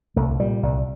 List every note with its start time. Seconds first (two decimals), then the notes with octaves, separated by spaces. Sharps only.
0.16 C2 A3
0.40 A#2 G3
0.63 C2